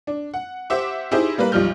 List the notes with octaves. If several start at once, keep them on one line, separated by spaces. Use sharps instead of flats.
D4
F#5
G4 C5 E5 F#5 D6
D#4 E4 G4 G#4 C5
G3 A#3 A#4 B4
B1 F3 G3 F6 G6